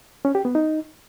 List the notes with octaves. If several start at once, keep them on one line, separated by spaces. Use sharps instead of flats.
C#4
G4
B3
D#4